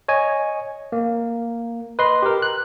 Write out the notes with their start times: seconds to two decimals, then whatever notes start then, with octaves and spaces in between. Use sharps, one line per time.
0.08 C#5 D#5 G#5
0.92 A#3
1.99 B4 D#5 C6
2.23 G4 A#4
2.42 F#6